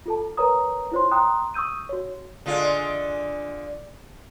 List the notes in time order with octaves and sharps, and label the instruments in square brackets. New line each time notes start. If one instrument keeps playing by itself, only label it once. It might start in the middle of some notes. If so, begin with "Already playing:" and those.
[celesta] F4 A4 A5
A#4 B4 C#5 A#5 D#6
E4 F4 C5 C#5 C6
G5 A#5 C6 D#6 F#6
C#6 D#6 E6 G6 D#7
F#4 C#5
[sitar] D3 G#3 F4